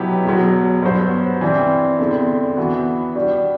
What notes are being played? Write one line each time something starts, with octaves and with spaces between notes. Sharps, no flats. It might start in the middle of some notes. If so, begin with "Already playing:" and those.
Already playing: B2 F#3 B3 E4 G4
E2 B2 F#3
G2 F#3 B3 F#4 C5
E3 G3 C4
E2 D3 G3 C4 E4
E3 B3 F#4
G3 D4 F#4